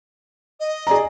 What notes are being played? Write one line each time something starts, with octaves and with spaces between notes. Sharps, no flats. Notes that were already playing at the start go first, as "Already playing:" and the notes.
D#5
G#4 D5 A#5